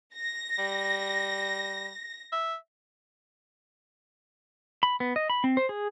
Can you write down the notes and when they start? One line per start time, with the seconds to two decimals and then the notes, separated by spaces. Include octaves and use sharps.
0.15 A#6
0.58 G3
2.32 E5
4.83 B5
5.00 B3
5.16 D#5
5.30 B5
5.44 C4
5.57 C5
5.69 G#4